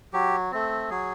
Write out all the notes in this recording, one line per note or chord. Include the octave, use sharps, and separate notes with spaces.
F#3 G4
A3 C4
F#3 G#4